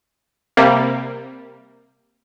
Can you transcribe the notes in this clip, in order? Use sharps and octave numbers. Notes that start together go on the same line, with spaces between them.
C3 G3 A#3